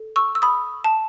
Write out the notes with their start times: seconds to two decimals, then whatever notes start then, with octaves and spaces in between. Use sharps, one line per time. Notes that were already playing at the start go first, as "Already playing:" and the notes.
Already playing: A4
0.16 C#6 E6
0.35 E6
0.42 B5 D#6
0.84 A5